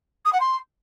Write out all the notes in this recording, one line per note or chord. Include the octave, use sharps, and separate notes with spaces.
D#6
F#5
C6